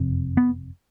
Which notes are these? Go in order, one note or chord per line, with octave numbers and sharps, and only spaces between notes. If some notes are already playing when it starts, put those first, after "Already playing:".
Already playing: F#1 F2 C3
B3